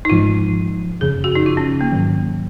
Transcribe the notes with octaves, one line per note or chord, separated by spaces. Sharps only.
D#4
G#1 G#2 F3 G#3 F4
F#1 F2 C#3 G#4
F#4
D#4
F4
C#4
A#3
G#2 D#3 F#3